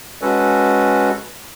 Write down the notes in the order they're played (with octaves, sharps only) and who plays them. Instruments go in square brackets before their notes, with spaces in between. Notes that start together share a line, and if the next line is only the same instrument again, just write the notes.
[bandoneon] G#3 C#4 F#4 A4 B4